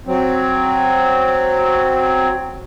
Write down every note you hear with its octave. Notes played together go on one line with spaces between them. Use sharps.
F#3 C4